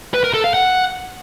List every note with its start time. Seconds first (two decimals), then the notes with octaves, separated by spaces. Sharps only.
0.14 B4
0.24 A#4
0.34 A4
0.44 F5
0.54 F#5